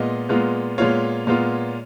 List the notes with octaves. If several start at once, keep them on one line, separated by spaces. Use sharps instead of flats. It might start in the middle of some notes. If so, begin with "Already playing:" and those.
Already playing: A#2 G#3 B3 F4 D#5
A#2 G#3 B3 F4
A#2 G#3 B3 F4 C#5
A#2 G#3 B3 F4